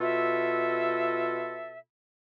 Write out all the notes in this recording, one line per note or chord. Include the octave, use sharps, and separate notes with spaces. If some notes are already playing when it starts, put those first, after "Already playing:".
B2 F4 A4 E5